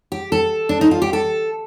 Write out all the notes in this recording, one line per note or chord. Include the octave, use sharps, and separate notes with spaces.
G4
A4
D4
D#4
F4
G4
A4